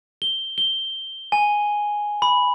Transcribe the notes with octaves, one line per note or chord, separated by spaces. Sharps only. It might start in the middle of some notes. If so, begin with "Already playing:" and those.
G7
G7
G#5
B5